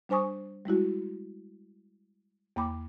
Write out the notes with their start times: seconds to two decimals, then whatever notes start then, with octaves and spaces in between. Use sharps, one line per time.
0.09 G3 D4 C5 G#5 C#6 D#6
0.65 G3 G#3 E4 F#4
2.56 E2 A#3 G5 B5 D6